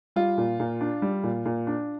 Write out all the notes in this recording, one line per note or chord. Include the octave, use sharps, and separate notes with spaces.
G3 F4
A#2
A#2
D4
G3
A#2
A#2
D4